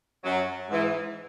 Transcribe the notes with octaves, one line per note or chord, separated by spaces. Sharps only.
F#2 F#3
G#2 E3